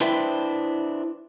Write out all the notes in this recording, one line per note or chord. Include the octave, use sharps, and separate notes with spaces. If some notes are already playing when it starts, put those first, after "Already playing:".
D4 E4 B4 C5 E5 G5